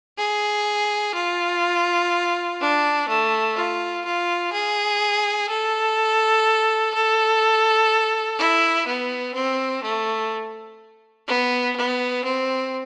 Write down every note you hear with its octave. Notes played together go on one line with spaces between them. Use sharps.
G#4
F4
D4
A3
F4
F4
G#4
A4
A4
E4
B3
C4
A3
B3
B3
C4